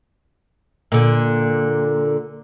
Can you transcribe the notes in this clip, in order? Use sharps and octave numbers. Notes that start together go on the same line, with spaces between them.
A#2 D3